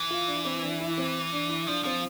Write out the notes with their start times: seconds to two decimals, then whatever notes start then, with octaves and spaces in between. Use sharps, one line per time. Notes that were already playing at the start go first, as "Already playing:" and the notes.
Already playing: E3
0.10 F4
0.27 D4
0.45 C4
0.63 D4
0.80 E4
0.98 C4
1.32 D4
1.49 E4
1.67 F3 D4
1.84 F3 C4